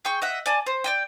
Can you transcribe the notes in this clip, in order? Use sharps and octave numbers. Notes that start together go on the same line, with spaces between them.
G#4 G5 C#6
D#5 E5 F#5
D5 G#5 A5
C5
D5 D#5 G5